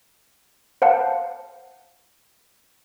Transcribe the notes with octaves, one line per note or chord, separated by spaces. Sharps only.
C5 F5 F#5 A5